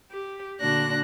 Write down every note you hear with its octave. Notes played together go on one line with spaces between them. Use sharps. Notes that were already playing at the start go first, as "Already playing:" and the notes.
G4
A#2 D3 D4 F#4 F#6 A#6